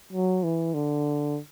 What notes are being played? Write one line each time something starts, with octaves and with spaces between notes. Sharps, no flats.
F#3
E3
D3